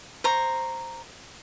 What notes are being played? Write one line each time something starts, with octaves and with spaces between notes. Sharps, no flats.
C5 A#5 C#6